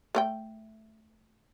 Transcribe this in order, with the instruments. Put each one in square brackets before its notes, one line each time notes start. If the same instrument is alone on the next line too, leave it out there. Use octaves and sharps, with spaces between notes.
[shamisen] A3 A#4 G5